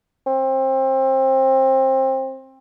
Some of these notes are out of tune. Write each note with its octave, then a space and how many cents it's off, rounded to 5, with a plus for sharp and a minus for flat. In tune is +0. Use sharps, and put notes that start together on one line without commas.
C4 +25